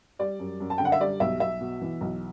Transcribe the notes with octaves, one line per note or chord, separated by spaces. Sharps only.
G3 D5
F#2
F#2
A5
D3 G5
F#5
E5
G3 D5
B1 E5
B1 E5
B2
E3
B1